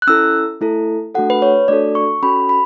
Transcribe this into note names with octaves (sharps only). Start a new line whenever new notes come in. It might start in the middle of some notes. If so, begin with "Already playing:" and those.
F#6
C#4 E4 A4 E6
A3 E4 A4
A3 D4 F#4 A4 F#5
B4
C#5
A3 D4 F#4 A4 D5
C#6
C#4 F#4 A4 B5
B5